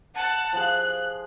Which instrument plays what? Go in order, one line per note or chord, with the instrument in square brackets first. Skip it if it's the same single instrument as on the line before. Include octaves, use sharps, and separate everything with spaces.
[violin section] F#5 A5 F#6
[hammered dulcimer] F3 G#4 [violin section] F#6